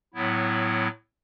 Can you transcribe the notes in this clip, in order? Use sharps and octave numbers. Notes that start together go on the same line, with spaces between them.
A2 F#3 B3 E4